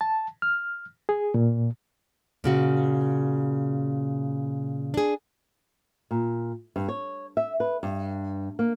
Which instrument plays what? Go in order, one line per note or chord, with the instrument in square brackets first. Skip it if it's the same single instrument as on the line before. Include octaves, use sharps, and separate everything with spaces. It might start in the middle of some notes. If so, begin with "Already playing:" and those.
[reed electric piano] A5
F6
G#4
A#2
[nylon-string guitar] A#2 C#3 F#4
D4 G#4
A#2
G2
C#5
E5
B4
G2
A#3